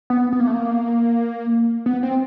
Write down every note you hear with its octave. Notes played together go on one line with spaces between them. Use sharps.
B3
B3
A#3
A3
A#3
B3
C4